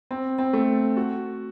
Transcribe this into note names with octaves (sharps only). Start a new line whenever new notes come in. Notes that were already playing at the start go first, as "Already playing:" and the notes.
C4
C4
A3
F#4